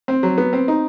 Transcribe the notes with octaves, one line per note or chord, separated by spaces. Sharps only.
C4
F#3
B3
C4
D#4